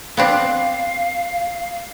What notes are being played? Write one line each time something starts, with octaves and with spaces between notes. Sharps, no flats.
B3 C4 D4 F5